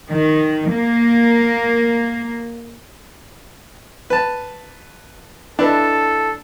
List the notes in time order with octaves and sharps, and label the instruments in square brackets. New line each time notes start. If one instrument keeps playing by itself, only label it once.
[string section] D#3
A#3
[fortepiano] B4 A5
[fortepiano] D4 [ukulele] E4 B4 D#5 [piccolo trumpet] A4